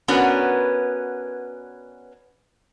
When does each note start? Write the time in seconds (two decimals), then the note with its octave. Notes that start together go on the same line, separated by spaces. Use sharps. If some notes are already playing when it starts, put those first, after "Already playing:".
0.08 B3 C#4 D4 F#4 A#4 B4